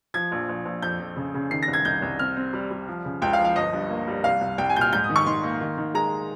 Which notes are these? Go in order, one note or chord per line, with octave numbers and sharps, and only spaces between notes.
F3 G#6
A#1
A#1
A#1
F2 G6
F2
C#3
C#3
D#3 C7
A#6
C2
G#6
C2 G6
C2
C4 F6
C4
G3
G3
F3
C#3
C#2 G5
F5
F3
F5
G1 D#5
G2
A#3
G3
C2 F5
C2
C2 G5
G#5
A#2 G6
F6
G#2 G6
D#6
D#3
C#6
D#3 C6
A#3
D#3
D#3
G#3 A#5